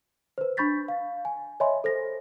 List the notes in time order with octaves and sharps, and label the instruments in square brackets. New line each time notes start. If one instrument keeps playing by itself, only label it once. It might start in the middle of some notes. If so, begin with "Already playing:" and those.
[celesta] B4 C5
D4 B5 C#6 G6 A6 B6
F5
G#5
C#5 D#5 E5 G#5 B5 C6
A4 C5 A#6